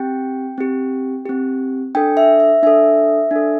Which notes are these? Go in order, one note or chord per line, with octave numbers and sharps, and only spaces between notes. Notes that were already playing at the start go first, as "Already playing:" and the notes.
Already playing: C4 G4 G5
C4 G4
C4 G4
D4 A4 G5
E5
E5
D4 A4 E5
D4 A4